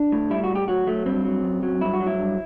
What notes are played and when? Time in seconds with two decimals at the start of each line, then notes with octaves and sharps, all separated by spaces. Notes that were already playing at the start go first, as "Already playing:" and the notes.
Already playing: D4
0.12 A2
0.30 G3 E4
0.44 F#4
0.49 A2
0.55 G4
0.68 F#3 F#4
0.87 F#3 A3
1.06 G2 C4
1.25 F#3
1.43 F#2
1.63 F#3
1.81 G2 E4
1.93 F#4
2.00 F#3
2.07 E4
2.18 G2